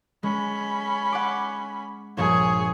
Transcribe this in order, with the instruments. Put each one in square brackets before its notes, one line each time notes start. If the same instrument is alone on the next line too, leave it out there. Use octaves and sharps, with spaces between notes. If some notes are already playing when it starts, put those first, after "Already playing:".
[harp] G#3 [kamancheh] C#4 B5
[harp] F#5 D6
[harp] A#1 G2 [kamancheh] G#4 C#5